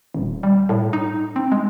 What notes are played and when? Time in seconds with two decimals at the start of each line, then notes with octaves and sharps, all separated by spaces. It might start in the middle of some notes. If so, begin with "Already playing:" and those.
0.14 D#1
0.43 G3
0.69 A2
0.93 D#4
1.36 C4
1.52 G#3